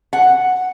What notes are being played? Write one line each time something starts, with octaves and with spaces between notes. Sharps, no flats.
F#5